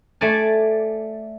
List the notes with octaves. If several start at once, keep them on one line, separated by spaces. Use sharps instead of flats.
A3 D5 G#5 A5